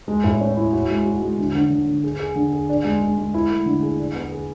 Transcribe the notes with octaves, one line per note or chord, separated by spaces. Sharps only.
G#3
A2
C#4
E4
F#4
G#3
F#4
G#3
D3
D3
D3
D3
G#4
G#4
D3
G#4
D4
G#3
G#3
G#3
E4
A3
D3
G#4
D4
B3
G#4